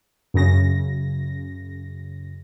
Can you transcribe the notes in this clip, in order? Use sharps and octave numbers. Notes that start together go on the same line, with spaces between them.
F#2 C#3 A#6